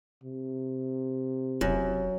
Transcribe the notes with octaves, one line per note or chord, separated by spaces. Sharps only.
C3
F1 F#2